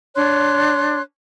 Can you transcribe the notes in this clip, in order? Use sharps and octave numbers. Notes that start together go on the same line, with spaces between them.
D4 C#5 C6 F#6